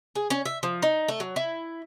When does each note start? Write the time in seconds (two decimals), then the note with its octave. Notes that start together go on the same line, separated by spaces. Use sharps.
0.15 G#4
0.30 C#4
0.46 E5
0.63 F3
0.82 D#4
1.08 A3
1.20 F#3
1.36 E4